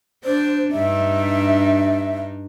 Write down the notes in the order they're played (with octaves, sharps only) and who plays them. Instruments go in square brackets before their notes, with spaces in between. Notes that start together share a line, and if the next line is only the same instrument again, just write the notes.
[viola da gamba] D4 [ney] C5
[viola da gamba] G2 D4 D#4 [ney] E5